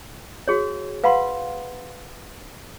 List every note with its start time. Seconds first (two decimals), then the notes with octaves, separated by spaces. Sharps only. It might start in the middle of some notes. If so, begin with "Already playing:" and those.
0.48 F#4 G#4 C#5
1.04 B4 F5 F#5 B5 C6